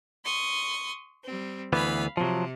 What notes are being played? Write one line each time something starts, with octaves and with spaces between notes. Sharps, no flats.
C6 C#6 D#6
G3 C4
D2 E3 B3 F5 B5
C3 F3 F#3